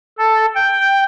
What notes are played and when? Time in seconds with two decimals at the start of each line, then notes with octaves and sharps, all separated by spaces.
0.18 A4
0.55 G5